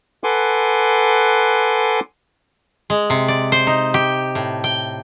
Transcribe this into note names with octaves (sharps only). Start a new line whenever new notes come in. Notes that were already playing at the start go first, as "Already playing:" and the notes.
A4 B4 F#5 G#5 C6 D6
G#3
C3
D5
C5
D#4
G4
A2
G5